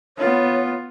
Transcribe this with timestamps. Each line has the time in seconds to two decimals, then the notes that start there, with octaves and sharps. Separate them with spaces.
0.18 B3 F4 C#5